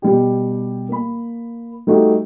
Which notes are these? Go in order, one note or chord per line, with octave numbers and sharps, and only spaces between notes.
B2 G3 G4
A#3 B5
G3 A3 D#4 F#4 G4